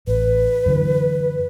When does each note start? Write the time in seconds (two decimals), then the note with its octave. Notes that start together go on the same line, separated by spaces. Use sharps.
0.07 A1 B4
0.66 F#2 D3 E3